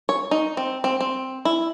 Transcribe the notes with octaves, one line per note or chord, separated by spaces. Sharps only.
C#5
D#4
C4
C4
C4
E4